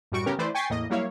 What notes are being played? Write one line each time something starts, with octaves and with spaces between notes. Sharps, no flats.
F#2 A2 G3 F#4 C#6 D7
C#3 B3 C#4 G4 A#4
E3 A3 E4 B4 C5 D5
G5 G#5 C#6 A6 B6 C7
E2 A2 A#3 D#5
F#3 G3 A#3 E4 C#5 F5